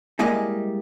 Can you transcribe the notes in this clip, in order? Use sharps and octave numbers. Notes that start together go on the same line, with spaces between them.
G3 G#3 A#3 E4 D#5 F5